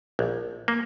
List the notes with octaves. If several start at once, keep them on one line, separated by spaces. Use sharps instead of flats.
A#1
A#3